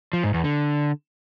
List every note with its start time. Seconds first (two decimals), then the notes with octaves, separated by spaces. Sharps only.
0.13 F3
0.24 G#2
0.34 E2
0.44 D3